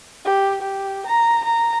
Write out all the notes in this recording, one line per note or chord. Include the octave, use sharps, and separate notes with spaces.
G4
G4
A#5
A#5